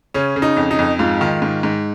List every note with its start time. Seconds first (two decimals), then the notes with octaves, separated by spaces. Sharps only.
0.14 C#3 C#4
0.36 C#3
0.42 D#4
0.57 F2
0.71 D#4
0.79 F2
0.99 G#2 F4
1.21 D#3
1.42 G#2
1.63 G#2